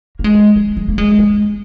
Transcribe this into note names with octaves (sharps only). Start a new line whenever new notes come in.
A#3
G#3
G#3
G#3
A#3
G#3
G#3